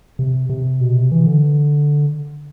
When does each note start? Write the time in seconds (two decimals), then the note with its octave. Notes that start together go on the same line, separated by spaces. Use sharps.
0.19 C3
0.50 C3
0.80 B2
0.96 C3
1.12 E3
1.26 D3